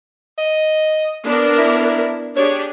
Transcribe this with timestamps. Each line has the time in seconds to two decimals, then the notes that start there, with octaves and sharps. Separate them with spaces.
0.38 D#5
1.24 B3 D4 A#4
1.58 E4
2.37 D4 G4 G#4 C#5